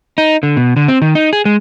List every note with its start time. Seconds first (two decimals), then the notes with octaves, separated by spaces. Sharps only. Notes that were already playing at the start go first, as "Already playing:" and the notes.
0.18 D#4
0.43 D3
0.57 B2
0.76 D3
0.88 C4
1.02 D#3
1.15 D#4
1.33 G#4
1.45 G#3